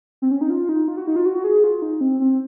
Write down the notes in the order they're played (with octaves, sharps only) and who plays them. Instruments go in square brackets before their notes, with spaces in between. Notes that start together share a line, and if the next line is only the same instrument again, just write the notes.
[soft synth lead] C4
C#4
D#4
F4
D#4
F4
F#4
D#4
F4
F#4
G#4
F4
D#4
C4
C4